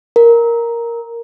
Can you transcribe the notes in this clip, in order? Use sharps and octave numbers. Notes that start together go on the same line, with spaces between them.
A#4